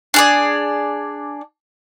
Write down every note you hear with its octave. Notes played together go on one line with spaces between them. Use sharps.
D4 G#4 D5